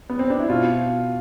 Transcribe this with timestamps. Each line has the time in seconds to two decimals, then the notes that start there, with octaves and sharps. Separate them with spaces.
0.10 B3
0.19 C4
0.30 D4
0.40 E4
0.49 B2 F4